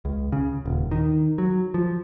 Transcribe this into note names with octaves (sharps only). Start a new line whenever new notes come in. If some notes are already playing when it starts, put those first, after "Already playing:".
C#2
C#3
D#1
D#3
F#3
F3